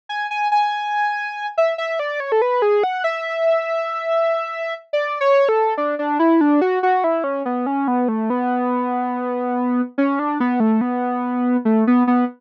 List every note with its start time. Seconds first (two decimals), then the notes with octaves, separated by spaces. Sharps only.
0.09 G#5
0.31 G#5
0.52 G#5
1.58 E5
1.78 E5
1.99 D5
2.20 C#5
2.32 A4
2.42 B4
2.62 G#4
2.84 F#5
3.04 E5
4.93 D5
5.21 C#5
5.49 A4
5.78 D4
5.99 D4
6.19 E4
6.41 D4
6.61 F#4
6.83 F#4
7.04 E4
7.24 C#4
7.45 B3
7.66 C#4
7.88 B3
8.08 A3
8.30 B3
9.98 C#4
10.19 D4
10.40 B3
10.60 A3
10.81 B3
11.65 A3
11.87 B3
12.07 B3